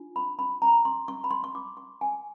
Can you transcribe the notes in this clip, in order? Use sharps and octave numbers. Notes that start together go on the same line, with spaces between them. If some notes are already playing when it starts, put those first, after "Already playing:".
Already playing: D4 F4
B5
B5
A#5
C6
C#6
B5
C6
C#6
D6
C#6
G#5